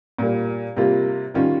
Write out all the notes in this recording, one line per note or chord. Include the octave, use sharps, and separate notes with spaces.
A#2 G3 A#3
C3 G3 A#3 F4
D#3 G3 C#4 F4